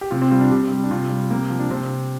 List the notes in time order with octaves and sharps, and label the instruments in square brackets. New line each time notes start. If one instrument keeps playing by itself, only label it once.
[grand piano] G4
C3 F4
C4
G3 F4
D4
C3 G4
G3
D4
C3 F4
G3
C3 A#3
F3
D4
C3 C4